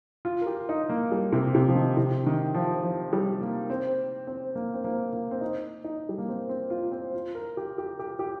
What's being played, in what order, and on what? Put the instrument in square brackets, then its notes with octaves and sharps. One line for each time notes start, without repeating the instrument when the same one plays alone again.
[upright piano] F4
A#4
G4
D#4
A#3
G3
C3
C3
F3
D#3
C3
D#3
F3
F3
G3
A#3
C4
C4
A#3
C4
A#3
A#3
C4
D#4
D#4
G3
A#3
C4
C4
F4
C4
F4
A#4
G4
G4
G4
G4